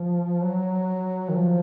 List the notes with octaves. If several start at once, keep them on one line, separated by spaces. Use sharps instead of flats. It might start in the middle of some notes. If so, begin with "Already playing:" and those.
Already playing: F3
F#3
D#3
F3